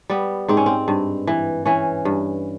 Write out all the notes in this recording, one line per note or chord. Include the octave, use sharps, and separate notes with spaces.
G3 B3
G#2 C4
C#4
C4
G2
E3
E3 C#4
G2